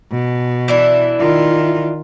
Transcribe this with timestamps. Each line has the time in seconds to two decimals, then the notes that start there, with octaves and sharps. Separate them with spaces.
0.12 B2
0.68 E3 D4 E4
1.20 D#3 F4